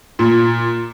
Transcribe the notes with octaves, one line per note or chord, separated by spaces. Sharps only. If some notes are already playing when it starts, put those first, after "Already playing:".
A#2